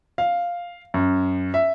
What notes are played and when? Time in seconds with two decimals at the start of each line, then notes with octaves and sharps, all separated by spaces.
0.18 F5
0.94 F#2
1.54 E5